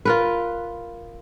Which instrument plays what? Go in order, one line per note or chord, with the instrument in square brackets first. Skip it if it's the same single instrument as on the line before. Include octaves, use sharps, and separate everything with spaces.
[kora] F4 A#4 B4